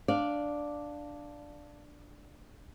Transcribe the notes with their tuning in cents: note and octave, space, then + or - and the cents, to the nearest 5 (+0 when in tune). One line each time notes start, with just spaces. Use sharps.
D4 +0 D5 +0 F5 +0